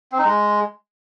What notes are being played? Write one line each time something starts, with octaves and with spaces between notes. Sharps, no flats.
C4
D#4
G#3